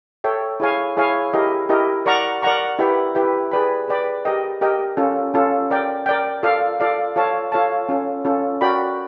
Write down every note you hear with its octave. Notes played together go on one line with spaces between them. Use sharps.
A4 C#5 E5 G5
E4 G#4 C#5 F5 G#5
E4 G#4 C#5 F5 G#5
E4 G4 A#4 D#5
E4 G4 A#4 D#5
A#4 D5 F#5 A#5 C#6
A#4 D5 F#5 A#5 C#6
E4 G4 B4 E5 G5
E4 G4 B4 E5 G5
G#4 B4 D5 G5 B5
G#4 B4 D5 G5 B5
G4 A#4 D#5 G5
G4 A#4 D#5 G5
C#4 F4 A4
C#4 F4 A4
A#4 D5 G5
A#4 D5 G5
F4 A4 D5 F5
F4 A4 D5 F5
F4 A4 C#5 F5 A5
F4 A4 C#5 F5 A5
C#4 F4 A4
C#4 F4 A4
F#4 A#4 D5 G5 B5